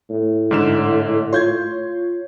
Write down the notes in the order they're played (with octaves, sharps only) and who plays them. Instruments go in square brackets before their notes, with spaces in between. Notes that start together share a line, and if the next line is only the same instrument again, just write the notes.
[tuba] A2
[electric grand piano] G#2 D3 E7
[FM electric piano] F4 C#5 [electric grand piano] C6 G6 G#6